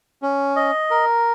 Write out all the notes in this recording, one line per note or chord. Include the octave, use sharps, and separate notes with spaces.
C#4
D#5
A#4